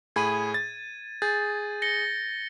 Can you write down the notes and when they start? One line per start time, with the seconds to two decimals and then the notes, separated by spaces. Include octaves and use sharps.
0.16 A2 G#4 B5 G#6 D#7
0.54 A6
1.22 G#4 G6 A6
1.82 A#6 C#7 G7